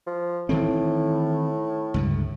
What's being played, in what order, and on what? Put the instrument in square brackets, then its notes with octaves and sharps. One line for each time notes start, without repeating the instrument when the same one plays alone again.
[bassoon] F3
[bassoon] A2 [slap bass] D#3 E3 C4
[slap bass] C#2 G2 D3